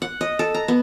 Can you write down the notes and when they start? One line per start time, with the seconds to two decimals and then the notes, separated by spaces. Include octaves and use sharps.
0.02 F#5
0.21 D#5
0.39 A4
0.54 A#5
0.68 B3